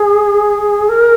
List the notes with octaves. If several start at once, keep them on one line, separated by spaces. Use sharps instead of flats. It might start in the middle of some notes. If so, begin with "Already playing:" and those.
Already playing: G#4
A#4